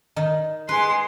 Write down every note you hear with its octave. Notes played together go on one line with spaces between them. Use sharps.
D#3 D#4
G#3 B4 C6